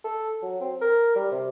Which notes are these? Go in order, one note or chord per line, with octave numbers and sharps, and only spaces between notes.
A4
F#3
C4
A#4
G3
C3